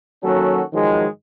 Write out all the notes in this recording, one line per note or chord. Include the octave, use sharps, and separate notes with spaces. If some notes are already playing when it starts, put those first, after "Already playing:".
D#3 F#3 A#3 C#4 F#4 A4
G#2 D#3 F3 F#3 G#3